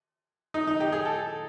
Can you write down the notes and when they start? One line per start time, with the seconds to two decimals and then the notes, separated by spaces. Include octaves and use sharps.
0.54 D#4
0.67 D#4
0.80 G4
0.92 G#4
1.05 A4